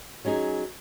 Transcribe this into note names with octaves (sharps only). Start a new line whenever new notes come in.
F#3 C#4 D#4 G#4